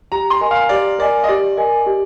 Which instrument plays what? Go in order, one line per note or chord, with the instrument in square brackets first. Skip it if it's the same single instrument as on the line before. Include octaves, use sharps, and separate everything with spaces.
[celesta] G4 [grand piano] A#5
[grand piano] C6
[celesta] A#4 D#5 G#5
[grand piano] F5
[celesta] G4 [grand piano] D5
[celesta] A#4 D#5 G#5 [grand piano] D5
[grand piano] D#5
[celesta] G4 [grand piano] D5
[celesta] A#4 D#5 G#5
G4